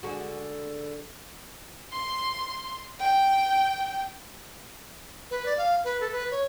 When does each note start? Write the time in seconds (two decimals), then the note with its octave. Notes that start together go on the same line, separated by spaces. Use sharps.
0.03 D3 G#3 F#4
1.93 C6
3.02 G5
5.31 B4
5.46 D5
5.58 F5
5.84 B4
6.00 A4
6.12 B4
6.31 C#5